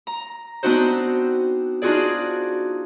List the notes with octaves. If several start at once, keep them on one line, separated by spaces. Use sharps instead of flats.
A#5
B3 C4 D4 D#4 F#4 C5
D4 D#4 F4 F#4 G#4 D5